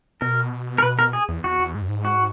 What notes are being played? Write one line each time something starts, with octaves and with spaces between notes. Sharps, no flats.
B2 A#4
A#4
B2 B4
A#4
G#4
E2
E2 F#4
E2
G#2
F#2
G#2
F#4